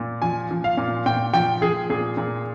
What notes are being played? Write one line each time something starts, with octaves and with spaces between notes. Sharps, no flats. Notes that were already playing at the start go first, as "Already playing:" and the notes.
Already playing: A#2
F3 G#5
F3
F5
A#2
A#2 G5
F3 G5
F3 G#4
A#2 G#4
A#2